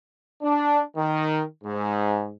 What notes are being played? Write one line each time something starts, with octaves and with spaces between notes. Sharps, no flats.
D4
D#3
G#2